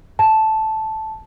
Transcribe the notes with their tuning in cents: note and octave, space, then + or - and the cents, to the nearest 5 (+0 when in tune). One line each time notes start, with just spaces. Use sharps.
A5 -5